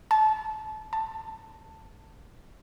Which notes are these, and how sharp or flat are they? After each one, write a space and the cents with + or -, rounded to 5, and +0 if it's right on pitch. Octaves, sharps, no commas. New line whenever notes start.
A5 -25
A5 +10